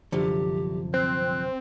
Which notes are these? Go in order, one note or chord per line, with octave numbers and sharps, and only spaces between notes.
C2 F#2 D3 F3 G4
C4 F#6